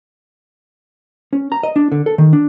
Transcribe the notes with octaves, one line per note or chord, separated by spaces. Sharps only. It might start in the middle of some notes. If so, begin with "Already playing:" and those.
C#4
A#5
D#5
D4
D3
A4
D#3
D4